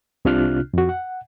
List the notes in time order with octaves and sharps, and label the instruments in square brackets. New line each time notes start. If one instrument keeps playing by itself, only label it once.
[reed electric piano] C2 C3 D4 F4 F6 F#6
F2 F#4
F#5